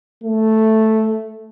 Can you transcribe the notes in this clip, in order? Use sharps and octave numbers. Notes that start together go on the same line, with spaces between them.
A3